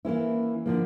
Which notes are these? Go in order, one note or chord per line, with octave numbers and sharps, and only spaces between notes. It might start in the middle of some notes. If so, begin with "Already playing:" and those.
E3 A#3 C#4 E4
D3 F3 A#3